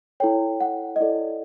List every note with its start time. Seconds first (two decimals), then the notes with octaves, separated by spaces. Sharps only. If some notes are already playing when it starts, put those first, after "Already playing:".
0.20 E4 A4 C#5 G5
0.60 F#5
0.96 D#5
1.01 E4 A4 C#5 D5